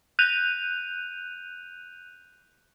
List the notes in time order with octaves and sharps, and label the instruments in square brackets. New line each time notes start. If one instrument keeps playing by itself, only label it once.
[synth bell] F#6 G6 D#7 F7